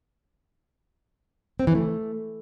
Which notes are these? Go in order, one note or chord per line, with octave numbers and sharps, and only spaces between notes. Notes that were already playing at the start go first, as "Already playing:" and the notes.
C4
E3
A3